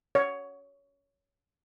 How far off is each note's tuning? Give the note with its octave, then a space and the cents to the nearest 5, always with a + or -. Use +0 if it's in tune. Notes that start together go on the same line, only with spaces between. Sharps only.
C#5 +15